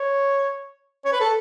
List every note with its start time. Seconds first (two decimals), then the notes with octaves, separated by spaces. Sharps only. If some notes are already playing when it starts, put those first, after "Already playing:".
Already playing: C#5
1.05 C#5
1.12 B4
1.21 A4